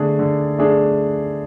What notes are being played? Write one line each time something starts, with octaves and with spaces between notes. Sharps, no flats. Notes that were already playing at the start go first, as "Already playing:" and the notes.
Already playing: D3 A3 D4 G#4
D3
A3 D4 G#4